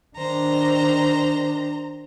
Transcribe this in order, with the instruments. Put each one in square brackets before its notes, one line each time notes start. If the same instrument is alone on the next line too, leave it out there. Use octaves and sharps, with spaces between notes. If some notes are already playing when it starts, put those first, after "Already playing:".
[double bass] D#3 D4 [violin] C5 A#5